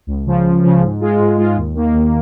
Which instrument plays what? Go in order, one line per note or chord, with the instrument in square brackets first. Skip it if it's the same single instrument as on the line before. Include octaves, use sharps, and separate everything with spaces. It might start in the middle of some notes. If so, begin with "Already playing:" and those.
[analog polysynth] C#2
C#3 F3
C#2
C#3 F3
G#2
G#3 F4
G#2
G#3 F4
D#2
D#3 A#3
D#2